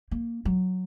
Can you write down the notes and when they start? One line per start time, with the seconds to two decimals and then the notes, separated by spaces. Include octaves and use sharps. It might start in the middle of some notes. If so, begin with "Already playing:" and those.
0.11 A#3
0.45 F#3